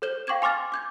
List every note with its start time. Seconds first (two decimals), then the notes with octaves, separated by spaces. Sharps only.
0.02 A4 C5 G6 E7 G7
0.27 F5 G5 C#6 D6 G#6 E7
0.42 G#5 C6 D6 F6 A6
0.72 D6 G6 G#6